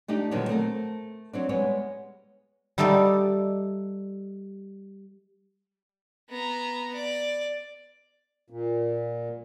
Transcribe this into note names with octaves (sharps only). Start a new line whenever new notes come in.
A3 D4 D#4 G4
A#2 D3 D#3 F#3 G3 B3
A3 C4 A#4
F#3 C4 D4
G3 G#3 B3 C#5
G3 A3 D#4 A4 D5
B3 A#5
D5
A#2